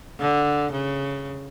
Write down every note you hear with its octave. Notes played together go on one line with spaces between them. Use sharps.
D3
C#3